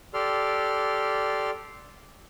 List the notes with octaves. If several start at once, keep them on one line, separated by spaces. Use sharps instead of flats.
G4 A4 D5 C6 F6